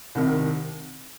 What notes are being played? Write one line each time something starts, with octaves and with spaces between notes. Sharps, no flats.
C2 C3 D#3